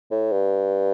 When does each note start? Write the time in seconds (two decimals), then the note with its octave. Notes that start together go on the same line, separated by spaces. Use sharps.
0.11 A2
0.32 G2